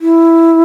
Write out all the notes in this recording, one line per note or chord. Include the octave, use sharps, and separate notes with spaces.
E4